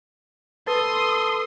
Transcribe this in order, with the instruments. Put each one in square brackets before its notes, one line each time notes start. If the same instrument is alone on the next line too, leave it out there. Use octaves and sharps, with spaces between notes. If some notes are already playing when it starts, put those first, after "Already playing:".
[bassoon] A4 [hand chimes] B4 A6 [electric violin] C6 D#6